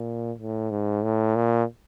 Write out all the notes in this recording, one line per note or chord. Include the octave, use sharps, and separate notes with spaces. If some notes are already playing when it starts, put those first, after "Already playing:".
Already playing: A#2
A2
G#2
A2
A#2